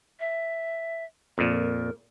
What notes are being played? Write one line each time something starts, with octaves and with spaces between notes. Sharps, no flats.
E5
F2 A#2 A#4